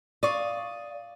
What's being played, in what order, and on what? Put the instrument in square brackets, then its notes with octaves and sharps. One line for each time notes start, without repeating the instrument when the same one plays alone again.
[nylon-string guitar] D5 [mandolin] F5 C#6 D#6